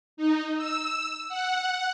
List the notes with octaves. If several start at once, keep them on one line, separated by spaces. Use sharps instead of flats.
D#4
E6
F#5